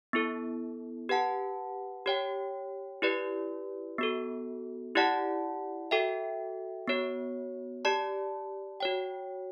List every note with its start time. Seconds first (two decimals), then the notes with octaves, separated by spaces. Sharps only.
0.13 B3 E4 A4
1.09 G4 B4 F#5 A5
2.06 G4 C#5 G5
3.02 E4 G4 B4 D5
3.98 B3 F#4 A4
4.95 E4 G4 D5 F#5 A5
5.91 F#4 A4 E5 G5
6.88 B3 F#4 C#5
7.85 G4 D5 A5
8.80 F#4 C#5 G5